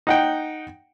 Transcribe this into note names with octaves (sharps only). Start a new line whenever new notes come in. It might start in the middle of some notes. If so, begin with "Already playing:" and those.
D#4 F#5 G5